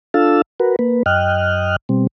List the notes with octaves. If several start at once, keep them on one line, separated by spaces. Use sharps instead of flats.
D4 F4 A4 F5 A5 E6
F#4 A#4 B4
A#3 B4
F#2 D#5 G5 F6 F#6
B2 G3 C4